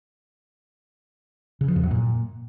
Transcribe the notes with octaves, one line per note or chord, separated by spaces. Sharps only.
C#3
F3
F2
F#2
A#2